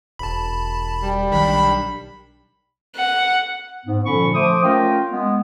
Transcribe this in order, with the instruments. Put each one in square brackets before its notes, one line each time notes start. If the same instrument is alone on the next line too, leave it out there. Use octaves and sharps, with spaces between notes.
[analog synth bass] E1 [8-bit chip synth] A5 B5
[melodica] G3
[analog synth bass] B1 [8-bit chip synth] D#3 D4 [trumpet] B5
[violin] F#5
[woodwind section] G#2 B3
A#2 D3 F3 C#4 B5 C#6
F3 A3 C5 D6 D#6
A3 C#4 F4 A#4 F5 G5
G#3 B3